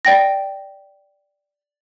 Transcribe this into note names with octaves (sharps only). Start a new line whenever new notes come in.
D5 G5 A#6